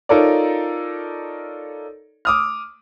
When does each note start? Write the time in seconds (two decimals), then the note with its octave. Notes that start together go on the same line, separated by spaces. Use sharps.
0.09 D#4 F4 A4 A#4 C#5 D5
2.25 D6 D#6 F6